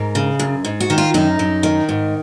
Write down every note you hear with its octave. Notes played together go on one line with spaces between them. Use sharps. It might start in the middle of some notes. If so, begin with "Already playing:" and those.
Already playing: G#2 A#4
C#3
F#2
G#2
F#4
D#3
F4
F#2 D#4
F#2
D#3
G#2